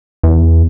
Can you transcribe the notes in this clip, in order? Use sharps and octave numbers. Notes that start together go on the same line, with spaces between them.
E2